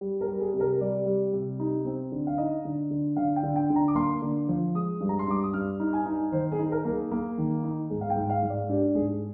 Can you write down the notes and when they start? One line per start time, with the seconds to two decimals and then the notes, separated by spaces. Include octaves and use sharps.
0.01 G3
0.21 A#4
0.28 G3
0.40 G#4
0.54 C3
0.60 A#4
0.81 G3 D5
1.06 G3
1.33 C3
1.60 D#4
1.85 C4
2.12 D3
2.27 F5
2.38 D#4 D#5
2.65 D3
2.91 D3
3.16 D3 F5
3.36 G5
3.43 D3
3.56 G5
3.70 D3
3.76 A#5
3.88 D6
3.95 A#3 C6
4.22 D3
4.49 F3
4.75 G#3 D#6
5.00 G2
5.09 A#5
5.19 C6
5.28 G2 D6
5.43 D#6
5.53 G2 F6
5.80 D#4
5.93 G#5
6.06 D#4
6.32 D#3 C5
6.52 G#4
6.59 D#4
6.71 A#4
6.85 A#3
6.92 G#4
7.11 A#3
7.38 D#3
7.64 D#4
7.90 G#2 G#4
8.01 F5
8.10 G5
8.16 G#2
8.29 F5
8.42 G#2
8.49 D5
8.69 D4 G4
8.95 G#2 G#4